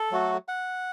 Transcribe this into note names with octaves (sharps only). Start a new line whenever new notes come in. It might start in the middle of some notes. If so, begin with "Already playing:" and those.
Already playing: A4
F#3 A3 F#4
F#5